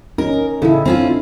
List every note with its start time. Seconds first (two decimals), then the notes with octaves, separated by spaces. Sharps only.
0.18 C#4 D#4 A#4
0.62 A2 C#3 D#4 E4 A4
0.85 D3 C4 C#4 F4